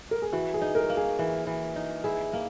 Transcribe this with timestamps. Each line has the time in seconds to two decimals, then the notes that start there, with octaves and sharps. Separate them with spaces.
0.11 A#4
0.22 G#4
0.33 E3 F#4
0.54 G#4
0.61 D#4
0.75 A#4
0.90 A#3
0.97 G#4
1.19 E3
1.47 E3
1.76 D#4
2.04 E4 G#4
2.33 A#3